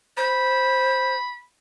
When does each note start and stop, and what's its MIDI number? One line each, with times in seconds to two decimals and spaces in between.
0.17 1.15 72
0.17 1.42 83